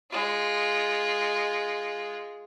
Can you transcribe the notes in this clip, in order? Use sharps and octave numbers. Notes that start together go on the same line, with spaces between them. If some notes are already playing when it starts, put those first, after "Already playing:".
G#3 F4